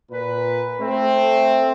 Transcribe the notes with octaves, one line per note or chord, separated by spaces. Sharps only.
A#2 B4
A3 C4